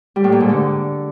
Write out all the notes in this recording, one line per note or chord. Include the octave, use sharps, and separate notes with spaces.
G3
A2
A#2
G#2
D3